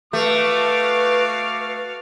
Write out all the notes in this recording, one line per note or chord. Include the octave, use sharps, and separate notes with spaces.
A3 F#4 B4 F5 D6